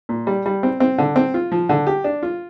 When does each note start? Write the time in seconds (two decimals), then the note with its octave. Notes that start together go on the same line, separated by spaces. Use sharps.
0.09 A#2
0.27 G3
0.46 G3
0.63 C4
0.80 C4
0.98 D3
1.16 C4
1.34 F4
1.52 F3
1.69 D3
1.87 G4
2.04 D4
2.23 F4